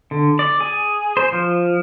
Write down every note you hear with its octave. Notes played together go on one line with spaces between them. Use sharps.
D3
D5
G#4
C5
F3